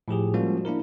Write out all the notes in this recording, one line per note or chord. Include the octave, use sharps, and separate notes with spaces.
A2 F3 G4 G#4
F3 G3 G#3 A#3 C#4 F#4
A#3 D4 E4 A#4